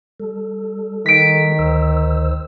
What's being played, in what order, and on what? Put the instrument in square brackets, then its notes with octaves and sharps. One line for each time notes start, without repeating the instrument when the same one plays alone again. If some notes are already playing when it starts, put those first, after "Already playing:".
[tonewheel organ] G3 A4
[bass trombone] D#3 [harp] B6 D7
[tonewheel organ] D2 C5 E6